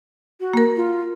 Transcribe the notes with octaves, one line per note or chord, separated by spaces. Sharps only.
F#4
A#3 A#4
F4